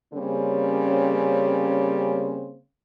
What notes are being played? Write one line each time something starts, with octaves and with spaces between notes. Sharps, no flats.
C#3 G3 A#3 C4 C#4